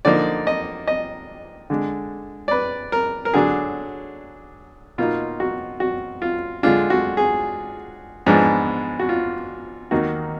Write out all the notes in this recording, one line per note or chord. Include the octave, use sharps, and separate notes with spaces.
D3 F3 A#3 D#4 D5
D#5
D#5
D3 G#3 D4
D5
B4
A#4
A#4
D3 F#3 D4 G#4
B2 A#3 D#4 F4
F#4
F#4
F4
D3 G#3 D4 F4
F#4
G#4
G#2 F3 G#3 B3 D4
F#4
F4
D#2 D#3 A#3 D#4 F#4